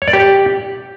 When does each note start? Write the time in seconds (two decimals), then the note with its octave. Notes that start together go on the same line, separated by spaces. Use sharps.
0.02 C#5
0.08 D5
0.13 G4